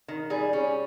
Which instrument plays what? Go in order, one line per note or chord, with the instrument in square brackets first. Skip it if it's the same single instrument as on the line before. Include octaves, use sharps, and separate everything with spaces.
[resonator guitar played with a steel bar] D#3
G3 G#4
C#4